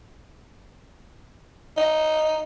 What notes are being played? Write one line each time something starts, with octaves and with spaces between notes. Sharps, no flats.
D#4